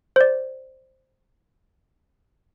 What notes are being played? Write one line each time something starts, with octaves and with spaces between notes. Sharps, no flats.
C5 D5